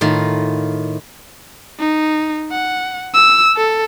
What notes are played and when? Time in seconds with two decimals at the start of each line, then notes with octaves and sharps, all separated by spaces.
0.01 A2 D#3 F4
1.79 D#4
2.52 F#5
3.14 E6
3.56 A4